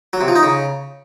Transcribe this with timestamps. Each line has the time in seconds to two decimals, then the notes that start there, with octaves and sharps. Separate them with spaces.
0.13 F#3
0.21 C3
0.28 F3
0.36 D#4
0.43 C#3